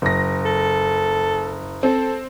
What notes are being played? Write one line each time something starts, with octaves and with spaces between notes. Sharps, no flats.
F#1 A#6
A4
C4 A4